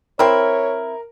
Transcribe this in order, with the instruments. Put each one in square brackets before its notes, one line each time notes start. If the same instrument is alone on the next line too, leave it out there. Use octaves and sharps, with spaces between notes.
[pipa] C4 E4 [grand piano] A#4 [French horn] C#5